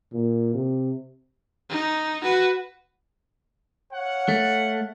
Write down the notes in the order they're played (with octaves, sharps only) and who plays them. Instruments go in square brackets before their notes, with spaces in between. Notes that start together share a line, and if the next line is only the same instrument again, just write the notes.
[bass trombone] A#2
C3
[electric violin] D#4
F#4 B4
[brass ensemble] C#5 F5 F#5
[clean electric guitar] A3